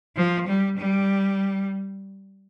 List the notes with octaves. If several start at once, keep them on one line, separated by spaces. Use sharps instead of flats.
F3
G3
G3